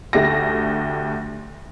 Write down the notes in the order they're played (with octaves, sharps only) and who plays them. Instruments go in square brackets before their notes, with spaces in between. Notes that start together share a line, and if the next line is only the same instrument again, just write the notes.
[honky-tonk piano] D2 A3 G4 A#6